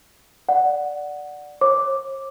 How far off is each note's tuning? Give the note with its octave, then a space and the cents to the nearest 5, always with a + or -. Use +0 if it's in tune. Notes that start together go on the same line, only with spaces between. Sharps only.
D5 +0 F#5 +0
C#5 -45 D6 +0